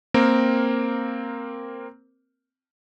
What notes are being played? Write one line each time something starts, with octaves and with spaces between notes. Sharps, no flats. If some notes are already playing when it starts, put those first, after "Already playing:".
A#3 C4 A#4